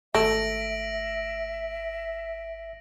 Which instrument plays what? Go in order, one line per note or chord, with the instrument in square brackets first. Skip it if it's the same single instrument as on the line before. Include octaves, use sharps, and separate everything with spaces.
[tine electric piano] G#1 [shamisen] A3 [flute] E5 [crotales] A#6 D7 F#7